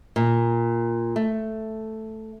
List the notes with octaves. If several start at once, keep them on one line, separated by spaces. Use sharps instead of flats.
A#2
A3